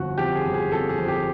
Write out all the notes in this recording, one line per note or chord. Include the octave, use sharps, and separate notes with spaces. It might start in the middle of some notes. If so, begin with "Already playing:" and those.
Already playing: G1 F2 F#4
F2 G4
G#4
G1
G#4
F2 A4
G#4
F2
G4